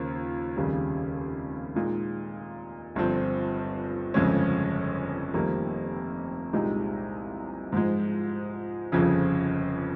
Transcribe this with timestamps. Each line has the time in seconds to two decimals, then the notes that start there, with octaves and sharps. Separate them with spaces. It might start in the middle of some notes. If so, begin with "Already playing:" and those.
Already playing: D#2 C#3 F3 A#3
0.56 F1 D#2 C#3 G3
1.76 A#2 G#3 D#4
2.95 G1 G2 F3 C4
4.14 G1 F2 C#3 G#3 C#4
5.34 F1 F2 D#3 G3 A#3
6.53 C2 A#2 G#3 D#4 G4
7.72 G#2 F3 G#3
8.92 G1 F2 C#3 F3